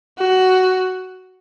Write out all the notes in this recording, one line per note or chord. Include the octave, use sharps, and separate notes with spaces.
F#4